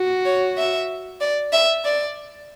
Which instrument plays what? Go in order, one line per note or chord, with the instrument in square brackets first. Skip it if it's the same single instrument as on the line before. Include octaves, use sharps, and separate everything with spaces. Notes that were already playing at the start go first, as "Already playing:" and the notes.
Already playing: [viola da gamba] F#4
[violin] C#5
E5
D5
E5
D5